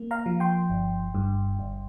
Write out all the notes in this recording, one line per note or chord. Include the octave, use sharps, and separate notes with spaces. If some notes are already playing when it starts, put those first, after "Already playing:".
Already playing: A#3
F5 A#5
F3
G5 C6
G1
G2
G1